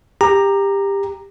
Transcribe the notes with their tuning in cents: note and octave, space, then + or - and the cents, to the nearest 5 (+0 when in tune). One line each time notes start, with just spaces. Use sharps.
G4 +20 A#5 +0